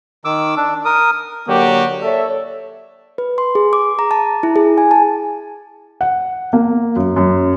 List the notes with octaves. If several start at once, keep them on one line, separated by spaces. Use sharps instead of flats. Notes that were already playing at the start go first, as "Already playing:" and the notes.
D#3 D6 E6
D4
A#4 D#6
D3 F#3 A#3 F#4 G4
A4 C#5 D5 E5
B4
C6
G#4
D6
A#5
A5
E4
G#4
G#5
A5
F#5
A#3
F#2
F#2